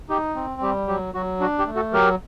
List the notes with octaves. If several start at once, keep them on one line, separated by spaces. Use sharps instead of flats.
D#4 G4
C4
G3 G4
F#3 G4
F#3 F#4
D4 F#4
G4
A3
F#4 A4
F#3 G4 A#4